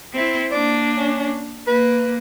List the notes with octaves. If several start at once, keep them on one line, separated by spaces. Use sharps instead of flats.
C4 E4
A#3 D4 D5
C#4
A#3 B4